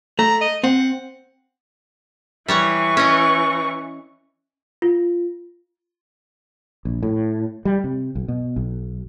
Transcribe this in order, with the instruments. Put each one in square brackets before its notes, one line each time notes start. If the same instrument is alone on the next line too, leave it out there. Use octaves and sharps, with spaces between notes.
[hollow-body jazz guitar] A3 [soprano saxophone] A#5
[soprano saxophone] D#5
[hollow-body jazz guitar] C4 [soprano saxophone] F#5
[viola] E3 C#6 [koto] G3 C#5 F#5
[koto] C#4 D#5
[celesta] F4
[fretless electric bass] A#1
A2
G3
C3
B1
B2
B1